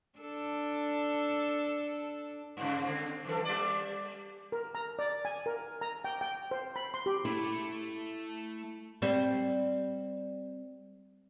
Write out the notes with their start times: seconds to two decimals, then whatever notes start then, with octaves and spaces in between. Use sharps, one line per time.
0.18 D4 A4
2.57 G2 C#3
2.84 D3 C4
3.25 F#2 E3 A4
3.45 G3 D5
4.52 A#4
4.75 A#5
4.99 D5
5.25 G#5
5.46 A#4
5.81 A#5
6.05 G5
6.21 G5
6.51 C5
6.76 B5
6.94 C6
7.06 G4
7.25 A3 E4
9.02 G3 C4